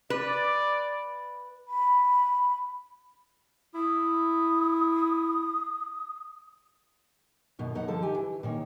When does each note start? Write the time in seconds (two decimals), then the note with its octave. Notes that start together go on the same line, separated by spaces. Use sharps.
0.10 B4 D5
1.68 B5
3.75 E4 D#6
7.59 F#2 B2 D#3
7.75 F#2 F#3 D#4 F#5
7.88 D3 F3 A4
8.02 D#3 G4 G#5
8.15 E3
8.43 A#2 D#3 C#5